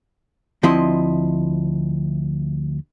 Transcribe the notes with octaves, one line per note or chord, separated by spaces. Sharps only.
D2 F3 C4 E4 D#5